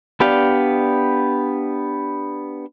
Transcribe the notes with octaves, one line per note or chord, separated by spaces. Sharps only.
B3 D4 G4 D5 F5